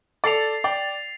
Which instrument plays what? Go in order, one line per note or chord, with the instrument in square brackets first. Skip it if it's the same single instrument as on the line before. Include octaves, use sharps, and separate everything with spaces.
[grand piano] A4 D5 [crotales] A6 C7 F7
[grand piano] D5 G5